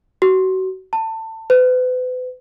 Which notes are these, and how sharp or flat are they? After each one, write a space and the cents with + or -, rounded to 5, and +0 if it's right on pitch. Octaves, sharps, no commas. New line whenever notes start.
F#4 +30
A5 +25
B4 +40